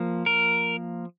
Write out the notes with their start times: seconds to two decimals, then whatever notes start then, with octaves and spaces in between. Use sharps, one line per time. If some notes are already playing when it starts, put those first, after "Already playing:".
Already playing: F3 A#3
0.26 A#4